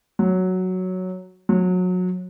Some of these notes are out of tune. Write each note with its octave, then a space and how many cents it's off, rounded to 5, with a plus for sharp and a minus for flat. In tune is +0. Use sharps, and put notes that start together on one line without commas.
F#3 +0
F#3 -25